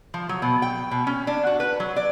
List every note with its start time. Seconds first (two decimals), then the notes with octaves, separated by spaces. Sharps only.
0.14 F3
0.29 F#3
0.42 B2
0.62 G5
0.91 B2
1.07 C#4
1.27 D4
1.47 F#4
1.60 B4
1.80 F#3
1.96 D5